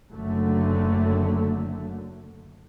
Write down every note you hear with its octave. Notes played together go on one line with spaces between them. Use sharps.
F#1 F#2 D3 F#3 A3